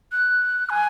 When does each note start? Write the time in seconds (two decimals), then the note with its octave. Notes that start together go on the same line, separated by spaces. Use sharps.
0.12 F#6
0.70 G#5